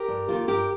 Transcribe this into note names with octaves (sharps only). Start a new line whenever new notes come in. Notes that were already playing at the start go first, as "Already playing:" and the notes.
Already playing: G4 A#4
G2
D#3 A#3 F4
G2 G4 A#4